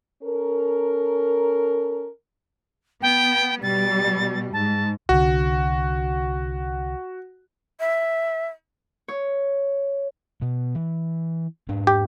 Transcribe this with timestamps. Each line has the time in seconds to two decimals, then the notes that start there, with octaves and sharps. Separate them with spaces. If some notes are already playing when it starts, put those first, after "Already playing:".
0.23 C#4 A4 A#4
3.02 B3 G5
3.63 B2 G3 A6
4.53 G#2 A5
5.09 C2 D3 F#4
7.80 E5
9.08 C#5
10.42 B2
10.75 E3
11.69 G#2 D4
11.87 G4